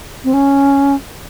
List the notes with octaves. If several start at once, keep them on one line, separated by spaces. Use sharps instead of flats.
C4
C#4